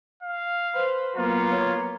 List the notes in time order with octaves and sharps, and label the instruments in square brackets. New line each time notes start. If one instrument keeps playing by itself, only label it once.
[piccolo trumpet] F5
[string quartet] B4 C5
[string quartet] F#3 A#3 B3 [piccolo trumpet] F4
[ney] C#5